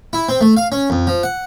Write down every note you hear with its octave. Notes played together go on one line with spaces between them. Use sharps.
E4
C4
A3
F5
C#4
F2
F3
F#5